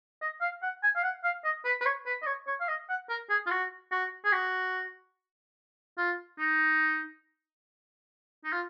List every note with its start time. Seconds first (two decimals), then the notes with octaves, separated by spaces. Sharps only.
0.21 D#5
0.41 F5
0.63 F#5
0.83 G#5
0.96 F5
1.03 F#5
1.24 F5
1.44 D#5
1.65 B4
1.81 B4
1.86 C#5
2.06 B4
2.22 D#5
2.26 C#5
2.47 C#5
2.61 F5
2.68 D#5
2.89 F#5
3.10 A#4
3.30 G#4
3.46 F4
3.51 F#4
3.92 F#4
4.25 G#4
4.32 F#4
5.98 F4
6.39 D#4
8.44 D#4
8.52 F4